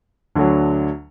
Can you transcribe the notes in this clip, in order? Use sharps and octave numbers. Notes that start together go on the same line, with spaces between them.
D2 D3 F#3